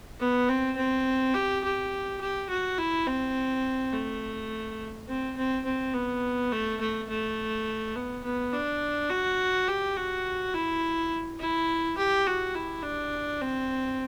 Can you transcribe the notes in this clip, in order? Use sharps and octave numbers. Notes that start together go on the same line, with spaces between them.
B3
C4
C4
G4
G4
G4
F#4
E4
C4
A3
C4
C4
C4
B3
A3
A3
A3
B3
B3
D4
F#4
G4
F#4
E4
E4
G4
F#4
E4
D4
C4